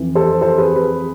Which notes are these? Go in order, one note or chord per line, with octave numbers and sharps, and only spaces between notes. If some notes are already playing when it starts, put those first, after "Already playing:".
Already playing: F2 E3
A4 C5
A4 C5
G#4 B4
G#4 B4